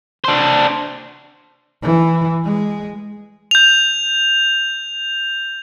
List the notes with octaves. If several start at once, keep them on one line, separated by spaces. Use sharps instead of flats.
D4 C5
E3
G#3
G6 F7